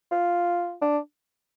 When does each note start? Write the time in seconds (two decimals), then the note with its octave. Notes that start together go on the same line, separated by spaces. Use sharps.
0.11 F4
0.82 D4